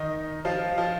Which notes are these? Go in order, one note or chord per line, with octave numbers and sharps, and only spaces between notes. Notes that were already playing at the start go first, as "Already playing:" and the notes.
Already playing: D#3 D#4
F3 F4
F3 F4